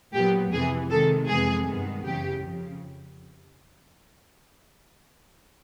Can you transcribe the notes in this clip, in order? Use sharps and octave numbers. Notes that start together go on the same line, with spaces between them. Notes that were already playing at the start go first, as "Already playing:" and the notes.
A#2 F#3 B3 G4
F2 C3 E3 G#4
C3 D#3 G#3 A4
F2 C3 E3 G#3 B3 G#4
G2 D#3 G#3 B3
F#2 C#3 E3 G4
F2 C#3 F3